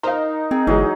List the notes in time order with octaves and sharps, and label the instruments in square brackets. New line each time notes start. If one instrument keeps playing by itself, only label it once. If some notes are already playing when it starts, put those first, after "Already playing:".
[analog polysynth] D#4 [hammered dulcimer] A#4 [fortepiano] C5 F5
[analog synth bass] C4 [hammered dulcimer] G#4
[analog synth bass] G1 [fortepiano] E3 G#3 [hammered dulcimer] F#3